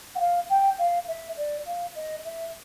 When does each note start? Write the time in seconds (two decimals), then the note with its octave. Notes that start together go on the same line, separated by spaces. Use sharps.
0.15 F#5
0.19 F5
0.49 G5
0.78 F5
1.07 E5
1.37 D5
1.66 F5
1.95 D#5
2.24 E5